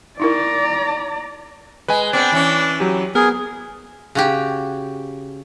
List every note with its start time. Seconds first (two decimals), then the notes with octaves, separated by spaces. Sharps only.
0.20 D#4 E4 A#4 D5 A#5
1.88 G#3 B4 G#5
2.13 B3 C4 D4
2.32 E3 C#4
2.80 F#3 G4
3.15 B3 G#4 A#4
4.15 C#3 F#4 G4